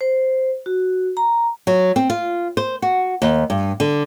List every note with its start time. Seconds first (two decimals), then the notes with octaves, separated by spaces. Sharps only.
0.01 C5
0.66 F#4
1.17 A#5
1.67 F#3
1.96 C4
2.10 F4
2.57 C5
2.82 F#4
3.22 D#2
3.50 G2
3.80 D3